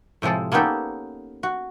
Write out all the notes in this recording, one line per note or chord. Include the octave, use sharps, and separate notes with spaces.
A2 C3 F3 G#3 A4
A#3 B3 C#4 D#4 G4 A4
F#4